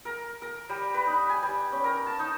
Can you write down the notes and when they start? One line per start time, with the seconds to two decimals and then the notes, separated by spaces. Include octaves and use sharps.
0.05 A#4
0.42 A#4
0.69 G3
0.94 B4
1.07 D#4
1.29 G#5
1.43 G3
1.72 C#4
1.84 A#4
2.06 A5
2.19 D#4